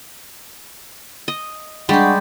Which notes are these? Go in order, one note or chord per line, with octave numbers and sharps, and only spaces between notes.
D#5
G3 G#3 D4 G4 F#5 C#6